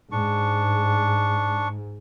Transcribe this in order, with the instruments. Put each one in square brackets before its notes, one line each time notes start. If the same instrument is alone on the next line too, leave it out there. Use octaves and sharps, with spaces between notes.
[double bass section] G#2 [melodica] D4 C#6